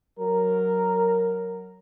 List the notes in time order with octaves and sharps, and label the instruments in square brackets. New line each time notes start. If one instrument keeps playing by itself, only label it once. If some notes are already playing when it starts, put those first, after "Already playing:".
[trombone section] F#3 A#4